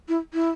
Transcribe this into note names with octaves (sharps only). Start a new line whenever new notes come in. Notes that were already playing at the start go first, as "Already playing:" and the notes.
E4
E4